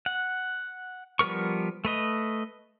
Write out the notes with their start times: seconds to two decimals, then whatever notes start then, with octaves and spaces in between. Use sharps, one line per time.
0.06 F#5
1.19 F3 G3 B3 A#4 C#6
1.85 A3 B4 D#5